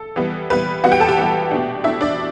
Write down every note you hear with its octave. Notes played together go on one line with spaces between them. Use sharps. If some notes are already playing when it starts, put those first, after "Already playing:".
Already playing: A4
E3 G3 B3
E3 G3 B3 B4
E3 G3 B3 F#4 F#5
G4 G5
A4 A5
G4 G5
E3 G3 B3
B2 A3 D4
B2 A3 D4 E4 E5
D4 D5